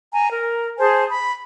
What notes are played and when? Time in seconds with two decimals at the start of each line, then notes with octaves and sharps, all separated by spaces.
0.13 G#5 A#5
0.30 A#4
0.78 G#4 C5 G#5 A5
1.09 B5